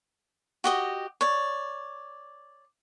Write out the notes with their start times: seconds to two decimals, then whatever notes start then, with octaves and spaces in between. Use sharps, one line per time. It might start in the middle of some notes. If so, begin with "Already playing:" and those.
0.64 F#4 G4 D#5
1.21 C#5 D5